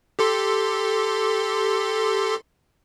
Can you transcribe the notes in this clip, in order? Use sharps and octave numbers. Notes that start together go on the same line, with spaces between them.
G4 A4 C6